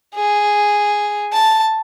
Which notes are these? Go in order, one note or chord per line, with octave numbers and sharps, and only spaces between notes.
G#4
A5